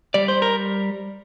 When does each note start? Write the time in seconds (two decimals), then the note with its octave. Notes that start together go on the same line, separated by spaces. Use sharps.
0.14 G3 D5
0.28 C5
0.42 A#4